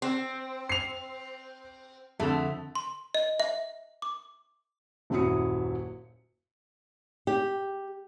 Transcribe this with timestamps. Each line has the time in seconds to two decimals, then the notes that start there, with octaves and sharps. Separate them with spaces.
0.02 C4
0.69 C7 F7
2.20 F2 D3 A3
2.75 C6
3.15 D#5
3.40 E5
4.02 D6
5.10 D#1 F#2 F#3 E4 D#6 C#7
7.27 G4